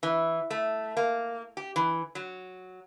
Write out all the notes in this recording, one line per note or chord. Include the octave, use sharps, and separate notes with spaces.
E3
A3
A#3
G4
E3
F#3